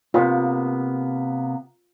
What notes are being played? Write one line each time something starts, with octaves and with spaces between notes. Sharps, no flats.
C3 A#3 B3 F4